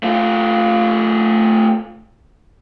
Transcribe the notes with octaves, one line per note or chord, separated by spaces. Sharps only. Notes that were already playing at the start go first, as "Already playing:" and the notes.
A3 F4